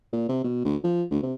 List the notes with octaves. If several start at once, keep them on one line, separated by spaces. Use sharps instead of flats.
A#2
C3
B2
D2
F3
D2
C3